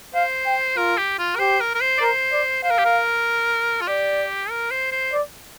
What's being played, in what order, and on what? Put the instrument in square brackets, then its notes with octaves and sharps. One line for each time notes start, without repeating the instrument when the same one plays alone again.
[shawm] C5 [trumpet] F5
[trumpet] G5
[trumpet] F4 [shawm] A#4
[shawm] G4
F4
A#4
[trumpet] G4 [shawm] C5
[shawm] A#4
A#4
C5
D5
[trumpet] A#4 [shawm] C5
[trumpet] D5
[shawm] C5 [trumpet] F5
[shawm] A#4
G4
A#4
F4
[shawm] G4 [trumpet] D5
[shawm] A#4
C5
C5
[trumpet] D5